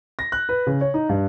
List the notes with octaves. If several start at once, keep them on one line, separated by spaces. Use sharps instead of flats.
A#6
F#6
B4
C#3
C#5
D#4
G2